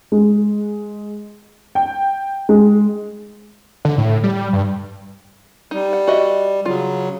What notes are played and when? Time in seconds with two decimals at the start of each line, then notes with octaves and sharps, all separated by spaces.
0.12 G#3
1.75 G5
2.49 G#3
3.85 D3
3.98 A2
4.23 G3
4.53 G2
5.71 G3 D#4
5.93 F#5
6.07 F#4 D#5 E5
6.66 C#3 F#3 F4